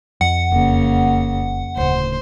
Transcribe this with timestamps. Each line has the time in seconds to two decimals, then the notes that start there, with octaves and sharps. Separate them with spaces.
0.21 F2 F#5
0.52 E1 C#3 A#3
1.77 D1 C#3 C5